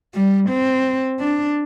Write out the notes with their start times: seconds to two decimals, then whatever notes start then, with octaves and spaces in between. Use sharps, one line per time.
0.14 G3
0.49 C4
1.20 D4